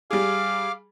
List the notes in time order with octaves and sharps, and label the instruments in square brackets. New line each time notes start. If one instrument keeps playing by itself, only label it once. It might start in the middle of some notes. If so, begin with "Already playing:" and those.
[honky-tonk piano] G3 G#4 [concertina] F5 D6 F6